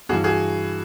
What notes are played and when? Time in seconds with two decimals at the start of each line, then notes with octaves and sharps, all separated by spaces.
0.09 G2 F#4 G#4
0.13 E3
0.24 F#4 G#4